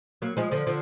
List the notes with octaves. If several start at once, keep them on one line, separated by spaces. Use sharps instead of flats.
F#3 A#3
F3 G#3
D3 F3
D3 F3